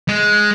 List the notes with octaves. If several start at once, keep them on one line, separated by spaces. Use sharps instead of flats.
G#3